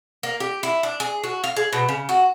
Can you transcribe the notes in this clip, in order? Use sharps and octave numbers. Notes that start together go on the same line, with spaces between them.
A#3
G4
E4
D4
G#4
F#4
F5
G#4
B2
C#3
F#4